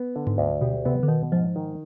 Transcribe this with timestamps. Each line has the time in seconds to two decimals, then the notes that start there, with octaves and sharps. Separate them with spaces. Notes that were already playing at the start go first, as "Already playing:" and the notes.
Already playing: B3
0.16 D3
0.27 G#2
0.38 D2
0.61 B2 G4
0.85 C3 B3
1.03 D3
1.08 B2 D#3
1.32 G#2 F3
1.56 D#3